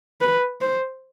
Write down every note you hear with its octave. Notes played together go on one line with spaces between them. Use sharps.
B4
C5